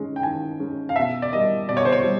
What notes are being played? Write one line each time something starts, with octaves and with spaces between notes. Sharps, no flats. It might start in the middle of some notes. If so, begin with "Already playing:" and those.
Already playing: D#3 G#3 C#4
G5
D#3 G#5
G#3 C#4
F5
B2 E5
D5
G3 A#3 D#5
B2 D5
C#5
C5
C#5
G3